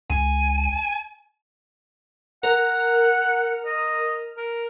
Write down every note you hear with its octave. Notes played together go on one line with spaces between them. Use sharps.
C#2 G#5
A#4 F#5
D#5
A#4